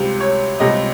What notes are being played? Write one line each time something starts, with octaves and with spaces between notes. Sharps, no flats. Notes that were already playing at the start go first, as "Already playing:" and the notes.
Already playing: C#2 C3 G3 C5
C#5
C#2 C3 G3 D#5